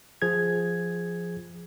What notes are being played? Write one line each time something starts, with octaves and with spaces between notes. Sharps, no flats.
F3 G#4 G#6